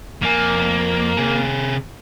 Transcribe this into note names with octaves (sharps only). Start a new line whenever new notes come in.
F2 A#3 G#5
C3 G#4